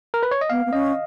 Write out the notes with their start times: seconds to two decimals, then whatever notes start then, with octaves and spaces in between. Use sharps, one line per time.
0.14 A#4
0.23 B4
0.31 C#5
0.41 D#5
0.50 B3 F5
0.66 B3
0.73 C#4 D#5